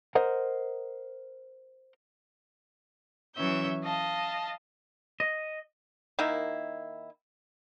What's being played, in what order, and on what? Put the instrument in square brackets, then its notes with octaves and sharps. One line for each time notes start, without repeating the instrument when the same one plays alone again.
[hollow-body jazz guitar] A#4 C5 D#5 F#5
[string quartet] E3 F#3 C#4 C#5 E5 G6
D#5 F5 A5
[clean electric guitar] D#5
[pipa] D#3 A#3 E4